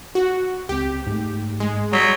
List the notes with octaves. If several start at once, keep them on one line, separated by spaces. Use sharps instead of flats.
F#4
C#2 C4 G4
G#2 A3
G#3
F#3 G3 B6